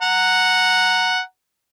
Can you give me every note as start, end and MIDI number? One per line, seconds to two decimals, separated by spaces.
0.02 1.20 78
0.02 1.20 82